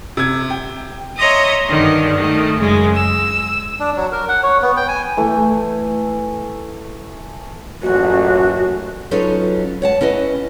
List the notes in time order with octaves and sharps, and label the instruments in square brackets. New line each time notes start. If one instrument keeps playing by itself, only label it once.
[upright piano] C3 G#6
G5
[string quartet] C#5 D#5 E5 A#5 C6 D#6
G2 D3 D#3
D#3 A3
F#2 C#3 G#3
E6
[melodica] D4
F#3
A#4
F#5
C#5
B3
G5
G#5
[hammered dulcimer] E3 A3
[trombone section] A1 F#2 A#2 [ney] F#4
[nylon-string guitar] F#3 C#4 D#4 F4 A4 B4
C#5 F#5 A5
C#4 E4 B4 D#5